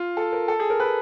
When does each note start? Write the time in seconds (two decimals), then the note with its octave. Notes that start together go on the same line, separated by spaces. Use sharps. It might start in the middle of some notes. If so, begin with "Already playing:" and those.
Already playing: F4
0.17 A4
0.33 A#4
0.48 A4
0.60 G#4
0.70 A#4
0.80 B4